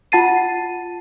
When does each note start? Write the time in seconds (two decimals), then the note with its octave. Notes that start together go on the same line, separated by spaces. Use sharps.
0.12 F4 F#5 A5 A6 C7 D#7